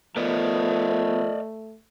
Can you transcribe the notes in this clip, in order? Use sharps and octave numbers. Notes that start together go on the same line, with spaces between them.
F3 A3 B3 A#4 D5 D#5